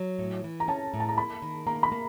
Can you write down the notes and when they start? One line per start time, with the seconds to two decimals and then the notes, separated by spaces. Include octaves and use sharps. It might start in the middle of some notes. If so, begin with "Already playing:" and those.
Already playing: F#3
0.19 A2
0.44 E3
0.60 A#5
0.68 C#4 A5
0.94 A2
1.00 A5
1.09 A#5
1.17 A#3 B5
1.42 D#3
1.67 A#3 A#5
1.83 B5
1.92 A#3